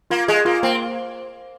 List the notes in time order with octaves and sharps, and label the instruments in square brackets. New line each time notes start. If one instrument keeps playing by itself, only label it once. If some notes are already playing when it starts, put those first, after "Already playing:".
[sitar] A#3 [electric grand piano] F4
[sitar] G#3 [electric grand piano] G#4
[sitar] A#3 [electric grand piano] F4
[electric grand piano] A#3 [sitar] C4